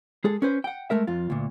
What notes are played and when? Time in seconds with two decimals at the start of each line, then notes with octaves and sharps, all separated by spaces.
0.24 G#3 G#4 A4
0.42 C#4 B4 C5
0.64 F#5 G5
0.90 G#3 A3 A#4 E5
1.07 F2 F4
1.30 D2 A#2